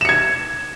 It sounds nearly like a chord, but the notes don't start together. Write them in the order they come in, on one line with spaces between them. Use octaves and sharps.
E7 C#7 G#6